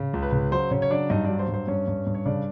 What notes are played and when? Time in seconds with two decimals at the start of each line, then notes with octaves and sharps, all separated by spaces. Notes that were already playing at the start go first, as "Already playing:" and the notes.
Already playing: C#3
0.13 C#2
0.23 B4
0.32 C#3
0.52 F#3 C5
0.71 C#3 C#4 C#5
0.82 C#5
0.90 F#3 D4 D5
1.10 G2 D#4 D#5
1.25 D4 D5
1.30 F#3
1.39 C5
1.48 G2
1.54 C5
1.67 G2 C#4 C#5
1.88 G2
2.07 G2
2.14 C#5
2.26 C#3 D4 D5